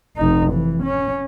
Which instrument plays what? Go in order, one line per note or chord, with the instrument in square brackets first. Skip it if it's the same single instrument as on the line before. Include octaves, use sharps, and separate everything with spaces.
[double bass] F1 D#4
E3
C#4